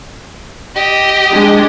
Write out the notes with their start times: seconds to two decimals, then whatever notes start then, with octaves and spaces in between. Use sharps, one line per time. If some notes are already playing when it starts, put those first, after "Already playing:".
0.76 G4 D#5
1.31 G#3 D4